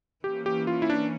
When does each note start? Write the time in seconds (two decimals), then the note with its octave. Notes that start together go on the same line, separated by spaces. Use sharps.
0.24 E3 A#3 C#4 G4
0.46 G4
0.67 F4
0.82 E4
0.90 D4